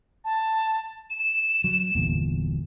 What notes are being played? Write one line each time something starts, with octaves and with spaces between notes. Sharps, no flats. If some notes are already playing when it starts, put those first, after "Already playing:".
A5
E7
F#3
G1 E2 A#2